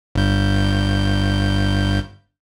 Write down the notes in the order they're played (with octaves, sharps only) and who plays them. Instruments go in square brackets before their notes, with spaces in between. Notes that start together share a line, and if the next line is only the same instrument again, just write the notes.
[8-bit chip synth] G1 G2 G6